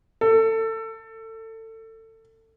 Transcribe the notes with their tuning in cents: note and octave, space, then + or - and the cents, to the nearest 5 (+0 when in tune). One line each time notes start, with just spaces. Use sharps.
A4 +25